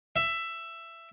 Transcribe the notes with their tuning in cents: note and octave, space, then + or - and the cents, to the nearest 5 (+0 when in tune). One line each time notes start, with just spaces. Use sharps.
E5 +15